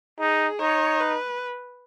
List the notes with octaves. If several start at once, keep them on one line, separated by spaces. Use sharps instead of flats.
D#4 G#4
D#4 C#5
B4